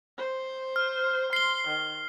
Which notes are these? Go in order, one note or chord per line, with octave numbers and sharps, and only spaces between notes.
C5
F6
C6 C7 G7
D#3